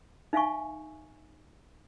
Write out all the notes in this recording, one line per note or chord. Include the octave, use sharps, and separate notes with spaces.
D#4 E5 F5 G#5 C#6